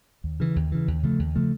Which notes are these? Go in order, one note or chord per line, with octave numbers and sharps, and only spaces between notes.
D#2
C#3 E3
D#2
C#3 E3
D#2
C#3 F3 A3
D#2
C#3 F3 A3